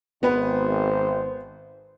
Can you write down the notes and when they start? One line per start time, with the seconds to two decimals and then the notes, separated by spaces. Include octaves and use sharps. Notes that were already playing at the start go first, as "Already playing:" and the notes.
0.23 G#1 B3 B4 C5